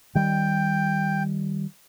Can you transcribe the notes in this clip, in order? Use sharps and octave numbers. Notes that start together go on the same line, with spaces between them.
D#3 G3 G5